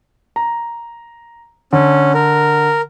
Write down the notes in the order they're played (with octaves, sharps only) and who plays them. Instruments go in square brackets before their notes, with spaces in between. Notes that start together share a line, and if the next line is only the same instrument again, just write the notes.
[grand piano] A#5
[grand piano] D3 [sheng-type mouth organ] C#4
[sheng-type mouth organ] A#4